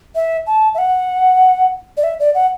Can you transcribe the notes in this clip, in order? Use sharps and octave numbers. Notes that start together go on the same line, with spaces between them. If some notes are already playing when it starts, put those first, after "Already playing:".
E5
A5
E5
F#5
D5
E5
D5
F#5